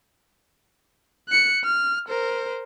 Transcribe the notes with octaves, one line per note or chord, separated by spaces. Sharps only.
F#6 C#7
F6
A#4 C5